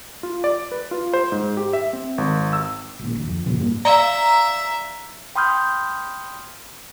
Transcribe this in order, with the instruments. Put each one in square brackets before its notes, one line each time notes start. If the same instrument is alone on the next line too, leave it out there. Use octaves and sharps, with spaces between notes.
[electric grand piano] F4
D5
B4
F4
C5
G#2
G4
E5
C4
G#1
E6
[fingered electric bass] G#1 A#2
D2
F2
A#2 C#3 F3
G2 A#3
[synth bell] D5 F5 [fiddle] E5 [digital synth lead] A#5
[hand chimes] G5 B5 C6 D#6 F6 G6